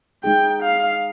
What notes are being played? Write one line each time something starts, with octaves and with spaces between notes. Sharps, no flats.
G#3 D#4 G#4 G5
F5